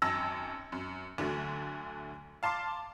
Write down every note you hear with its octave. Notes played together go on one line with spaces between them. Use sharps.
G#1 F#2 A5 E6 A#6
F#2
D2 D3 F#3 A3
F5 A5 C6 D6 C7